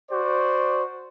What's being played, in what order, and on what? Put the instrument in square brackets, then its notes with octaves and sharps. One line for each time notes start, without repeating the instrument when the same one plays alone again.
[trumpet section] F#4 C5 D5